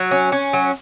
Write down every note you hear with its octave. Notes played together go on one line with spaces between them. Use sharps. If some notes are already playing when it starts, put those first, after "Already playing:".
Already playing: F#3
C#4
C#4
F#3